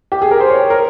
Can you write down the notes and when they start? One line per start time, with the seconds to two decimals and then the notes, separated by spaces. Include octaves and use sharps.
0.12 G4
0.22 G#4
0.31 A#4
0.40 C5
0.50 C#5
0.70 A#4